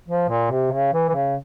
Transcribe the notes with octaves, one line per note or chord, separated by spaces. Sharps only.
F3
A#2
C3
C#3
E3
E3
C#3